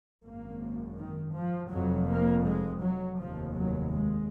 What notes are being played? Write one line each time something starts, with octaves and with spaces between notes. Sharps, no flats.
G#1 F#2 A#3
D#3
F3
F1 F2 F#3
A#3
G#3
F#3
F1 D#2 F3
F#3
G#3